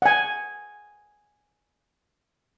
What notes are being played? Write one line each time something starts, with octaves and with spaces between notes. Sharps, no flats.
F#5 G#5